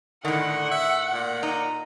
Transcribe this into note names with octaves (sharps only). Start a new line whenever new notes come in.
A2 D3 D#3 F#5
E5
A#2
D#4